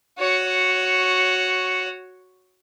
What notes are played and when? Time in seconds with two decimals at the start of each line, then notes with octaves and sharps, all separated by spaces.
0.19 F#4 C#5